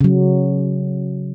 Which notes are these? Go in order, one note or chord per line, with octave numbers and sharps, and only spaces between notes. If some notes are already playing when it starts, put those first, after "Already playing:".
C#3 F#3